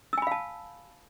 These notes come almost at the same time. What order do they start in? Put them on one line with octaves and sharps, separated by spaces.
E6 G#5 B5 F5 A5